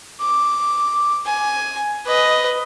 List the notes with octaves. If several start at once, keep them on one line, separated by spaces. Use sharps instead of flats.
D6
G#5
B4 D#5